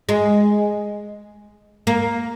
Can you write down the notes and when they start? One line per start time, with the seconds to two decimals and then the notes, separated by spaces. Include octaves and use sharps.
0.09 G#3
1.87 A#3